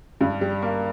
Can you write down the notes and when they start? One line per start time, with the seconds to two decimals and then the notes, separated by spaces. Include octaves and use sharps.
0.21 G2
0.41 G3
0.62 A#3